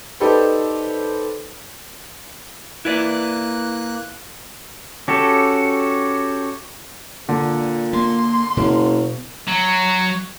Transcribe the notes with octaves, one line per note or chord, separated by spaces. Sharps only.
D#4 G4 A4 B4 C5 D5
A#3 E4 B4 D5 F#6
C#4 F#4 G4 A4
A#2 D3
A#3 C6
F#1 B2
F#3